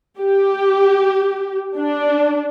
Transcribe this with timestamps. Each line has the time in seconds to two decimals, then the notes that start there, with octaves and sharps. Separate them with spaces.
0.18 G4
1.78 D4